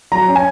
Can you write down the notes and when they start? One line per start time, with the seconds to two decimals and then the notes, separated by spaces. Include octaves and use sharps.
0.12 F#3 A#5
0.28 C#4
0.35 G#5